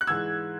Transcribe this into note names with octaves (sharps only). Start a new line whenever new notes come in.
F#6
G#2 E3 G#3 E6 G#6